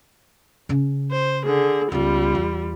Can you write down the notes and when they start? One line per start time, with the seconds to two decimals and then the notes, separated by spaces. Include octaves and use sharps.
0.69 C#3 C#4
1.12 C5
1.46 D3 G#4
1.92 C#2 G3 B3 F4
2.35 E2